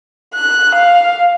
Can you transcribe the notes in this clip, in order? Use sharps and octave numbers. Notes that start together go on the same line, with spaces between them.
F#6
F5